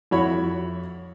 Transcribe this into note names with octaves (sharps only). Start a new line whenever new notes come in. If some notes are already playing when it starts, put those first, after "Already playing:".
F2 E4 F#4 C#5 B5